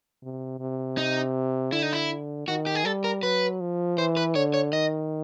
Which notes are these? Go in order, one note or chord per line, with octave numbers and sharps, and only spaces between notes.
C3
C3
D#4
D3 E4
D#4
E4
D#3 F#4
G4
G#4
G3 A4
A#4
F#3 B4
F3
E3 C5
B4
D3 C#5
C#5
D#3 D#5